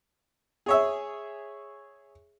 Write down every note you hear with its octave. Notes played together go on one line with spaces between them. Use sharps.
G#4 C#5 E5